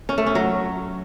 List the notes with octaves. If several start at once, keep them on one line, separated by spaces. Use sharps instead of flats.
C#4
A3
C#4
F#3